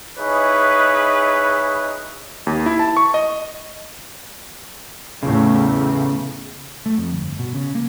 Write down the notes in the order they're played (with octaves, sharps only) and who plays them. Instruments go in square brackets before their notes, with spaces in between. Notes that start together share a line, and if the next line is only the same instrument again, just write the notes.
[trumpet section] D#4 E4 G#4 B4 C#5 D#5
[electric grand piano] D#2
E4
A5
C#6
D#5
[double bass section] E2 A2 [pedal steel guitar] C#3
[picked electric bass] A3
F2
G1
B2
C#3
A#3